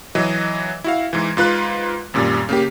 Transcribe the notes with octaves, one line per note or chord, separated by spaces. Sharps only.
E3 F#3 D#5
E4 F#4 F5
G#2 E3
G#2 F4 B4 F#6
G#1 F#2 A#2 G3
C#3 A#3 G4